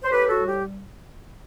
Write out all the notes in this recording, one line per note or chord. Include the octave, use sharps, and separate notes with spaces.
C5
A2 G4 B4
F#4 A4
G3
G4